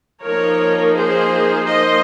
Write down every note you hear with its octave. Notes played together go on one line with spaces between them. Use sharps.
F3 A#3 D#4 A#4 C#5
G#4 C5
C5 D#5